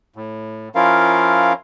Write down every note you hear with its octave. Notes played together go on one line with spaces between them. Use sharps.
A2
F3 C#4 E4 F4 A#4 F5